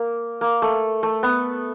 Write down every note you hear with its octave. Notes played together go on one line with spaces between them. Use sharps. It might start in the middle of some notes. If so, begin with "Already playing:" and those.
Already playing: A#3
A#3
A3
A3
B3